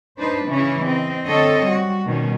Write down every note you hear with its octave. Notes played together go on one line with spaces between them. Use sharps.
D4 D#4 B4 C5
C#3 E3 C#4 E4
C4 D#5
D3 C4 A4 C#5 D#5
G3 F#4
B2 D#3 G3 C#4